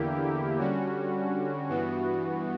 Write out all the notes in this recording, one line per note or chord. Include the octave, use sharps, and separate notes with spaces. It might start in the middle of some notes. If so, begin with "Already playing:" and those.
Already playing: E2 D3 A#3 E4 G4
D3 G3 C#4 F#4
G2 E3 B3 F#4